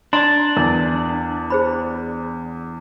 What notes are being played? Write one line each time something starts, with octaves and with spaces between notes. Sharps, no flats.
D4 D5 A#5 C6
E2 A#4
G#4 C5 B5